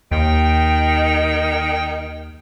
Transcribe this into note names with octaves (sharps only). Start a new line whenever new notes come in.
D#2 D#3 G5